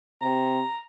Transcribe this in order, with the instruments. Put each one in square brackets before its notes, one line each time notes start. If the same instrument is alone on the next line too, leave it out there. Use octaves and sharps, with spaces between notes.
[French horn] C3 [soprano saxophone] A#5